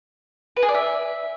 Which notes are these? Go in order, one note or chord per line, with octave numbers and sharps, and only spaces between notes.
B4
G#4
D5
E5